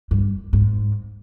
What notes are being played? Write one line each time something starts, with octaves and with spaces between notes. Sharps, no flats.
G2
G#2